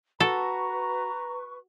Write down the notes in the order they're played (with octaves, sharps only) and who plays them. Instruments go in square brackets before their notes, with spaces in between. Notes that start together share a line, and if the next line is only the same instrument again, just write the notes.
[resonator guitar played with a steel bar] F#4 [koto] A4 [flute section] B4 C#6 [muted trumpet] A#5